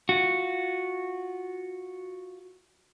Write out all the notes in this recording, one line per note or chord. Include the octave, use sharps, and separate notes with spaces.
F4 F#4